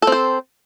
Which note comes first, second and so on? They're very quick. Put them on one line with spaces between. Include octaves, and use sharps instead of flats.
A4 C4 C5